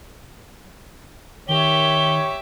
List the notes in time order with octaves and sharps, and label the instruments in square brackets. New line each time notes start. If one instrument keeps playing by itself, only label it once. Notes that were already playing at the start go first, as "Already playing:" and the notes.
[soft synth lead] D#3 [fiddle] G4 E5 [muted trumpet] C#5 [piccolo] G7